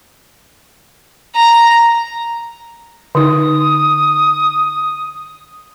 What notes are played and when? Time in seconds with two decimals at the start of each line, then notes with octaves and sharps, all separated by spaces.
1.35 A#5
3.15 D3 D#4 D#6